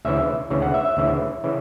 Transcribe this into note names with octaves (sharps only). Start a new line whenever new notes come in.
D2 C#3 E3 E5
D2 C#3 E3
F#5
E5
E5
D2 C#3 E3
C#3 E3